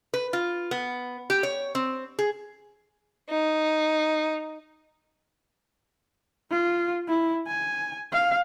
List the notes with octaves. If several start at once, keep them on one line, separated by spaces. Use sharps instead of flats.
B4
F4
B3
G4
C#5
C4
G#4
D#4
F4
E4
G#5
F5